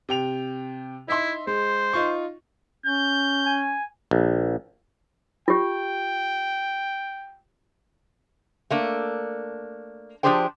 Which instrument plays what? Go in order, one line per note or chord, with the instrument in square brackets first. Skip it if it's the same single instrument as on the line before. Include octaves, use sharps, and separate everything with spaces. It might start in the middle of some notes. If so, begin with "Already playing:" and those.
[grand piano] C3 G5 F7
[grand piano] D#4 E5 C6 [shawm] E4
[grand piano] G#3 [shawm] C5
[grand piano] D#4 F4 C#6
[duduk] C#4 [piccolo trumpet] G6
[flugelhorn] G#5
[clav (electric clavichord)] A#1
[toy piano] F4 G4 [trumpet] G5
[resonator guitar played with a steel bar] A3 A#3 D4
F3 D4 G4 G#4 C5 G5